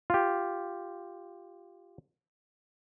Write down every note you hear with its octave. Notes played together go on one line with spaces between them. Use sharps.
F4 G4